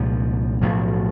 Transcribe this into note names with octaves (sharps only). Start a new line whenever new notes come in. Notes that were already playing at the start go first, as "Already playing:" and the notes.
Already playing: C2 A#2 F3 G#3
B1 A2 F3 A3